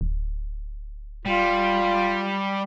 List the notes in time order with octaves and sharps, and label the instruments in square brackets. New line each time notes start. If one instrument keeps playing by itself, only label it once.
[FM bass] D1
[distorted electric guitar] G3 [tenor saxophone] F4